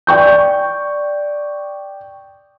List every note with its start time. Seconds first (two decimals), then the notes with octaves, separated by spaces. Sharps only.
0.07 D5 G5 C#6 G6